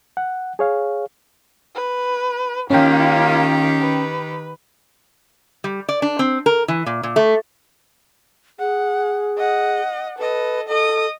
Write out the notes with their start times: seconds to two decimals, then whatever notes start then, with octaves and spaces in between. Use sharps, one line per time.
0.17 F#5
0.59 G#4 C#5 F5
1.75 B4
2.70 D#3 A#3 C#4 F4 G4 G5
3.79 B4
5.64 G3
5.89 D5
6.02 D4
6.19 C4
6.46 A#4
6.68 E3
6.86 A#2
7.03 A#2
7.16 A3
8.59 G#4 F#5
9.38 D#5 F#5
10.19 A4 B4 D#5
10.69 A4 D#5 D#6